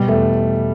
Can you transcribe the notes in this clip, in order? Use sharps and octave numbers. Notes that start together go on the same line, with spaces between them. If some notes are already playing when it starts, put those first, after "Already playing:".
Already playing: B2 G3
E2 A3